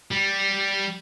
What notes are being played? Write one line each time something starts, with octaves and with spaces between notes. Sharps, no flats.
G3